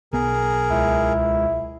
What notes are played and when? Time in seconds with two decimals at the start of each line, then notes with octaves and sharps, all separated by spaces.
0.13 B1 B3 G#4 A#4
0.70 C#2 E4